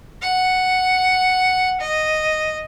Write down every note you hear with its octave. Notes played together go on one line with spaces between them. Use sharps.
F#5
D#5